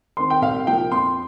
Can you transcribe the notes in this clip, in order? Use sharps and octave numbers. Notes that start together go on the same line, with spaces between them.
D#3 C4 C6
G5
C2 F5
A#2 F3 A#3 G5
F2 C6